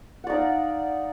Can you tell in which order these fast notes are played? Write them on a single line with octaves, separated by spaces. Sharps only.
F#5 D5 D#4 F5